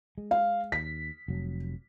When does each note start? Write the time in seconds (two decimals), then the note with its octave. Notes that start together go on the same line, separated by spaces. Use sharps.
0.18 G#3
0.31 F5
0.72 D#2 B6
1.28 F1 F#3